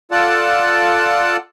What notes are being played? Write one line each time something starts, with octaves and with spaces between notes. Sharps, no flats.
F4 A4 D5 F#5 A5